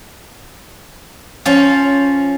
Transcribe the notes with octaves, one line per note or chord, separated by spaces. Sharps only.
F3 C#4